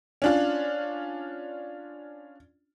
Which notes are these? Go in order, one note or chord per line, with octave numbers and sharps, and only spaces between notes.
C#4 D4 F4